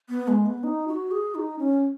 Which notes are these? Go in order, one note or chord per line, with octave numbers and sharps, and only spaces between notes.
B3
G#3
B3
D#4
F#4
G#4
D#4
C#4